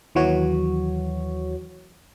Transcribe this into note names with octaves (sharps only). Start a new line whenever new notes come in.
D#2 E3 F#3 F#4 C#5